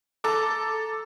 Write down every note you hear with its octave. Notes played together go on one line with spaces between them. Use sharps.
A4 A#5 D6